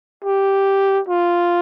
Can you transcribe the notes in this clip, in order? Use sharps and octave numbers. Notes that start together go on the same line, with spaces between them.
G4
F4